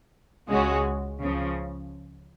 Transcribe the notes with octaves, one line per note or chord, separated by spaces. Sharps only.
C#2 C#3 G#3 C#4 F#4
C#2 C#3 F3